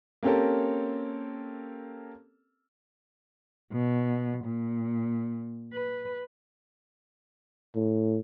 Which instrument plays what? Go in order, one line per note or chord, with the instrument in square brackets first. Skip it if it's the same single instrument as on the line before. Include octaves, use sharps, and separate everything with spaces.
[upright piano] A#3 C4 C#4 G4 A4 A#4
[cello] B2
A#2
B4
[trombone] A2